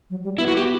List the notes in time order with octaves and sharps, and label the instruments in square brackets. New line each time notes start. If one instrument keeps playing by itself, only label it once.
[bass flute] F#3
G3
[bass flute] B3 [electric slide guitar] E4
[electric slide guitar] F#4
G4